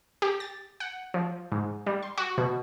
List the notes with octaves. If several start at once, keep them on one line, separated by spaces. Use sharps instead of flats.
G4
A6
F#5
F3
G#2
G3
C6
F#4
B2